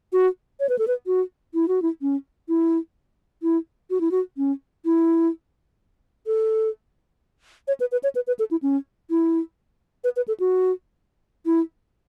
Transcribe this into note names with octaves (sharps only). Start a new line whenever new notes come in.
F#4
C#5
B4
A4
B4
F#4
E4
F#4
E4
C#4
E4
E4
F#4
E4
F#4
C#4
E4
A4
C#5
B4
B4
C#5
B4
B4
A4
E4
C#4
E4
B4
B4
A4
F#4
E4